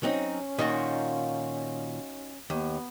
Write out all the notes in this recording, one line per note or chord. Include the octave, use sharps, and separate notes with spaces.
F#3 C4 C#4 D#4
A#2 D#3 D#4 F4 F#4
D#2 B3